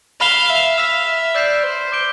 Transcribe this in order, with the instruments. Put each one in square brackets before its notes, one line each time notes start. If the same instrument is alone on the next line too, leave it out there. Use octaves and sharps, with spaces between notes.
[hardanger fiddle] F5 [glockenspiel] B5 F6 B6 E7 G7
[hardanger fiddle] E5
[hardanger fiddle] F5 [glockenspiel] E6 B6 F7
[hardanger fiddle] E5
[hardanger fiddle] D5 [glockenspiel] E6 G6 C7
[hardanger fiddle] C5
[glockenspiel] D6 G6 D7 G7